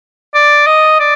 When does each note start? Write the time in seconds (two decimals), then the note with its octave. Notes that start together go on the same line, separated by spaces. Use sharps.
0.34 D5
0.67 D#5
1.00 D5